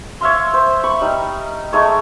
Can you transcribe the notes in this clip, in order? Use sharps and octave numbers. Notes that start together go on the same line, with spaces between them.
C#5 E5 F5 C6
C5
B5 C#6
G3 D#4
G#3 A3 D#4 C#5